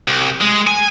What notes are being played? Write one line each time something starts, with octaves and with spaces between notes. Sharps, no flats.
C2
G#3
G#5